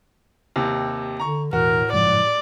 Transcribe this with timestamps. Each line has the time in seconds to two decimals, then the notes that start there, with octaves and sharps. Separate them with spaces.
0.56 D#2 C3
1.20 D3 A#5 C#6
1.53 E1 A2 E3 F#4 A#4
1.93 F#1 G#2 F3 D5